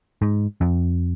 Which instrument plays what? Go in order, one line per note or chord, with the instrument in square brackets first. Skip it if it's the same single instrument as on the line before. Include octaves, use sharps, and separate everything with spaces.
[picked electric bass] G#2
F2